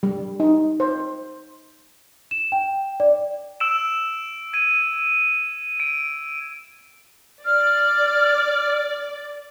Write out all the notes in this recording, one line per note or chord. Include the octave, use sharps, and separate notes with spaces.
G3
D#4
C5
E7
G5
D5
E6 D7 E7
G#6 D#7
D7
D5 F6